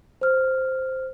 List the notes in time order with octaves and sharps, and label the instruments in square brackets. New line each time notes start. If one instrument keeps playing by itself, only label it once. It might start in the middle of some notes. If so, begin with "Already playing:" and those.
[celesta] C5 F6